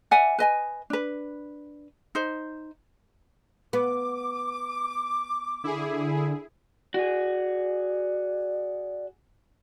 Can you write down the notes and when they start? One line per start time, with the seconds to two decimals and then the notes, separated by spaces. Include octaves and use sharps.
0.11 D5 E5 F#5 G#5
0.39 B4 D#5 G#5
0.90 D4 B4
2.15 D#4 C5
3.73 B3 D6
5.64 D3 E4 G#4
6.94 F#4 G#4 D5